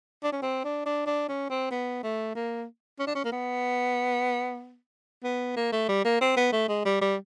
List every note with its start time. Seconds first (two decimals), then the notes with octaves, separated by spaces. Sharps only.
0.23 D4
0.32 C#4
0.42 C4
0.64 D4
0.86 D4
1.06 D4
1.29 C#4
1.50 C4
1.71 B3
2.03 A3
2.35 A#3
2.99 C#4
3.07 D4
3.15 C#4
3.25 A#3
3.32 B3
5.23 B3
5.56 A#3
5.72 A3
5.88 G3
6.05 A#3
6.21 C4
6.37 B3
6.52 A3
6.68 G#3
6.85 G3
7.01 G3